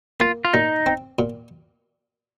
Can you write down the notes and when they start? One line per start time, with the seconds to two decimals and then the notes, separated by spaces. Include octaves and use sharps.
0.20 A#3 F4
0.45 F4
0.53 A#2 D#4
0.86 C4
1.19 A#2